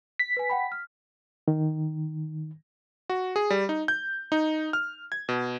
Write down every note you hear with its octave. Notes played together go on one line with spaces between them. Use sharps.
B6
B4 G#5
F#5 G5 B5
F6
D#3
F#4
G#4
G3
D#4
G6
D#4
F6
G#6
B2